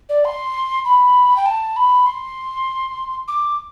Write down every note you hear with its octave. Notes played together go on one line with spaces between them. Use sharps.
D5
C6
B5
G5
A5
B5
C6
D6